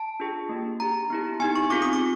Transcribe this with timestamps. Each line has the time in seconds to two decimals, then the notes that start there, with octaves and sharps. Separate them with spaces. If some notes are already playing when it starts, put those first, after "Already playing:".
Already playing: A5
0.20 D4 F4 G#4
0.49 A#3 D4 G4
0.80 D4 G4 A#5
1.10 B3 E4 G4
1.40 B3 D#4 G4 G#5
1.56 C#6
1.70 C4 F4 G#4 D6
1.82 D#6
1.93 D6